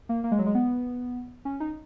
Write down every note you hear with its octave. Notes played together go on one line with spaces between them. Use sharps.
A#3
A#3
G#3
F#3
G#3
B3
C#4
D#4